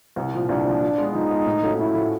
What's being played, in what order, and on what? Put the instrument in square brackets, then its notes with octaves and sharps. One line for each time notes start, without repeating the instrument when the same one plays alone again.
[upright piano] C2
A#2 F3
[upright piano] C2 [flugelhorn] D4
[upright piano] A#2 F3
F3
G#3 B3
[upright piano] F3 [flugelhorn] D#4
[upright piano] G#3 B3
A2
F3 A3 C#4 F#4
[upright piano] A2 [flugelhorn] E4
[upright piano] F3 A3 C#4 F#4